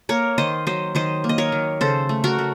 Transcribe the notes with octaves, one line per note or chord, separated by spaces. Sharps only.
A#3 A#4 C#5
D#3 C5 D#5
F#3 C5 D#5
D#3 C5 D#5
A#3
D#5
A#4 C#5
D#3
C#3 A4 C5
A3
F#4 A#4
A3